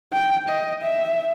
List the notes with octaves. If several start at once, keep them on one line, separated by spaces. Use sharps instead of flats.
G5
D#5
E5